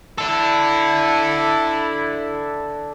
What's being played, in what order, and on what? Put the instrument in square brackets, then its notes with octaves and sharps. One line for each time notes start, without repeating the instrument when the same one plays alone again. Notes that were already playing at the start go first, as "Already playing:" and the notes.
[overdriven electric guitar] D4 A4 [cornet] E4